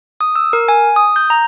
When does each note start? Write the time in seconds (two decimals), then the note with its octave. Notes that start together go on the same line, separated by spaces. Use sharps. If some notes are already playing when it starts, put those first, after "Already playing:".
0.21 D#6
0.36 E6
0.53 A#4
0.68 G#5
0.96 D#6
1.16 G6
1.30 A#5